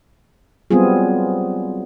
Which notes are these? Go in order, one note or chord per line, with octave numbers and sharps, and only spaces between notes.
F#3 G3 B3 C4 F4 G#4